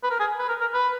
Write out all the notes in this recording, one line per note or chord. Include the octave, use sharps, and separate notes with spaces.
B4
A#4
G#4
B4
A#4
A#4
B4